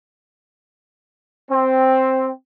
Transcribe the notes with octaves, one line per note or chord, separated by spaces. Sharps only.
C4